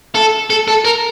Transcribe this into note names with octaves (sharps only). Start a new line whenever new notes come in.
A4
A4
A4
A#4